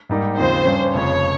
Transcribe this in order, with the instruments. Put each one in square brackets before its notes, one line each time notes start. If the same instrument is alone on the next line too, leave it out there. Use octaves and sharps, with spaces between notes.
[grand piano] G#2 G3 A#3 D#4
[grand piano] D#2 C#3 F3 C4 D#4 [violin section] C5
[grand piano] G2 G3 C#4
[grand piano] F1 F2 C#3 F3 [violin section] C#5